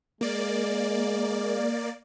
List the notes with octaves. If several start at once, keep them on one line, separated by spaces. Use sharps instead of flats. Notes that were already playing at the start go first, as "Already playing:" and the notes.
G#3 A#3 D5